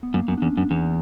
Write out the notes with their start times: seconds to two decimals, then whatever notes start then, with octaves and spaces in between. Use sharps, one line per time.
0.03 B3
0.14 F#2 A#3
0.28 F#2 B3
0.37 D4
0.42 E2 C#4
0.57 F#2 D4
0.71 E2